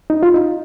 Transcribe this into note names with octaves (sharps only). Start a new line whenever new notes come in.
D#4
F4
D#4